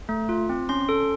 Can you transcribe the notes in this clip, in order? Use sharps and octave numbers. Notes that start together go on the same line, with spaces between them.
A3
F4
C4
C#4 C6
A4